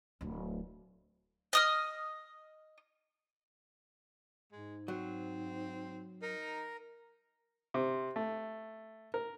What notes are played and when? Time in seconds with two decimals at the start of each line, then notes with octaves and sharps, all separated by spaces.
0.21 D1 D4
1.53 D#5 D#6 F6
4.52 G#2 G#3
4.88 F#3 C4
6.22 D#4 A#4
7.74 C3
8.16 A3
9.14 A#4